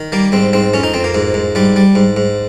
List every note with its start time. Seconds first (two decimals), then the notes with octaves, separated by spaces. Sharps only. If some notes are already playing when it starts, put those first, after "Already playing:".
Already playing: D#3
0.12 G3 A#3
0.32 G#2 C4
0.53 G#2 C4
0.73 F2 C#4
0.83 D#4
0.94 F2 C4
1.04 A#3
1.15 G#2
1.34 G#2
1.55 G#2 G3
1.76 G3
1.95 G#2
2.16 G#2